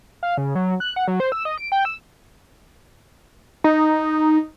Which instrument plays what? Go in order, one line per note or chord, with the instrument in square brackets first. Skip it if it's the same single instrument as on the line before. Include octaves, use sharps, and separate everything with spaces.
[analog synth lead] F5
C#3
F#3
F#6
F#5
F#3
C5
E6
D#5
D7
G5
E6
[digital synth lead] D#4